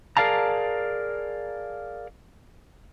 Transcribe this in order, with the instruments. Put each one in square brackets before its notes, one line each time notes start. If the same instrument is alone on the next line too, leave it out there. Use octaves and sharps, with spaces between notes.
[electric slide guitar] G#4 A#4 D5 F5 A5 A#5